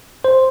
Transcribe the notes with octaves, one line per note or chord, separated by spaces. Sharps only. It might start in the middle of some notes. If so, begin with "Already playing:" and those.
C5